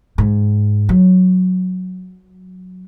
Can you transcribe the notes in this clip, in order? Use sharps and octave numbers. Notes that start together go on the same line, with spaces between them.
G#2
F#3